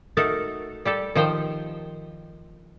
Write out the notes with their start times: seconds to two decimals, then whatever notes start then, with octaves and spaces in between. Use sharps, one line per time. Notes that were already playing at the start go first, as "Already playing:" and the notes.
0.17 A3 D#4 F#4 A4 A#4
0.85 G3 G4 A4
1.15 D#3 F3 C5 G5